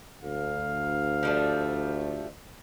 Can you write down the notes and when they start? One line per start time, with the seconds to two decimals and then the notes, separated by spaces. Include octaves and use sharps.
0.22 D2 F5
1.23 F3 G3 A3